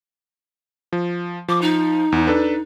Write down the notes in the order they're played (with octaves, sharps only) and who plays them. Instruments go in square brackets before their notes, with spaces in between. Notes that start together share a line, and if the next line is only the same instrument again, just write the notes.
[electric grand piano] F3
[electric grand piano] F3 [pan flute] D6
[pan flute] D#4
[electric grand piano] E2
D4 A4 B4